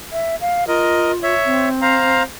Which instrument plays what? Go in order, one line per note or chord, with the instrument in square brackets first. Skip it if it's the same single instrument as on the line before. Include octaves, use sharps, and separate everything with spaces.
[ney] E5
F5
[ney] F4 [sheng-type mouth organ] A#4 D#5
[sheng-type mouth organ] C#5 E5
[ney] C4
[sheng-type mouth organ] C5 F5 A#5